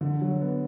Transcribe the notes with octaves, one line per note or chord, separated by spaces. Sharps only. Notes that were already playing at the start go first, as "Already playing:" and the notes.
D3
F#3
B3